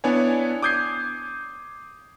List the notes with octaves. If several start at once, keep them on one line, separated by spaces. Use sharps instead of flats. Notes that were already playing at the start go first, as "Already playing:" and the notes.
B3 D4 E4 C#5 D5 G#5
D6 D#6 G6 G#6 C7